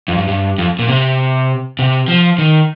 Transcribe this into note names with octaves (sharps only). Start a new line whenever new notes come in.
F2
G2
G2
F2
A#2
C3
C3
F3
D#3